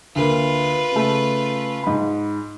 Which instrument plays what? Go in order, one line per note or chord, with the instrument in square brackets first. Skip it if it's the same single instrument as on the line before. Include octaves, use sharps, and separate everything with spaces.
[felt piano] D2 A#3 [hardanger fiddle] F4 B4
[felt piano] C#3 A3
G#2 B5